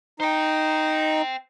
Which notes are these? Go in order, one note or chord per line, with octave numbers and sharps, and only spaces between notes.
D#4 C5 G5